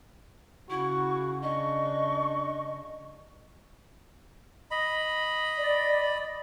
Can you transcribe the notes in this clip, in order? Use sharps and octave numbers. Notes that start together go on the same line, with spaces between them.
C#3 E4 F#4 C#6
D4 D#5 C#6
D#5 B5
D5